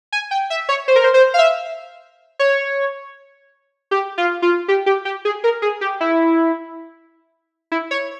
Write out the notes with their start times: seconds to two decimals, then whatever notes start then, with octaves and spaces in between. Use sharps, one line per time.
0.12 G#5
0.31 G5
0.50 E5
0.69 C#5
0.88 C5
0.96 A#4
1.04 C5
1.14 C5
1.34 F5
1.39 E5
2.39 C#5
3.91 G4
4.18 F4
4.42 F4
4.68 G4
4.86 G4
5.05 G4
5.25 G#4
5.44 A#4
5.62 G#4
5.81 G4
6.00 E4
7.72 E4
7.91 C#5